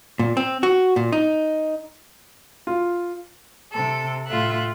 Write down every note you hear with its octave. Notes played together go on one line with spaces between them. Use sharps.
A#2
C4
F#4
A#2
D#4
F4
C3 A4
A2 F4 A4 E5 F#6